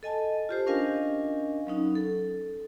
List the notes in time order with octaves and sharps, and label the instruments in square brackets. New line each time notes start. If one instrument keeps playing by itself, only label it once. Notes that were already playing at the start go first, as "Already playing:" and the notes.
[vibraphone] A4 D#5 G#5 A5
F4 G4 C5
C#4 D4 A#4 D#5 F5 G#5
F#3 C#4 D#4
A4